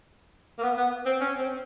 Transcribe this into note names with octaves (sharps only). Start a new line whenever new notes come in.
A#3
B3
B3
C4
C#4
C4